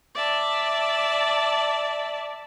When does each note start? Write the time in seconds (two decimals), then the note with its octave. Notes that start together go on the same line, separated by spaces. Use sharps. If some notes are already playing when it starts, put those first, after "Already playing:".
0.13 D5 E5 A5